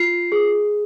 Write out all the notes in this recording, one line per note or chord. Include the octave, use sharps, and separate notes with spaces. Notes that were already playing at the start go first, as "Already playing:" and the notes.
Already playing: F4 C7
G#4